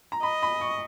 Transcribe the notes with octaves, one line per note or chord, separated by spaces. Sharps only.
A#5
D#5 B5
B5
C#6